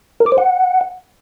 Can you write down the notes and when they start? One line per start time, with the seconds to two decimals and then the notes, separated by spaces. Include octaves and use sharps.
0.20 A#4
0.26 D6
0.32 C5
0.38 F#5